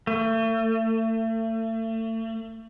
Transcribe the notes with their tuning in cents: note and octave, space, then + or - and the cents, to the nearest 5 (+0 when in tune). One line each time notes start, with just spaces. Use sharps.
A3 +35